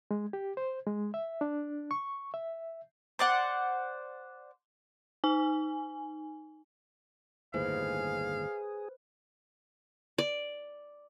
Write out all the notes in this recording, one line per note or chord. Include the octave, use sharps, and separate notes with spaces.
G#3
G4
C5
G#3
E5
D4
C#6
E5
C5 D5 F#5
D#4 G#5
G1 D#2 A2 G#4 B4 C5 F5
D5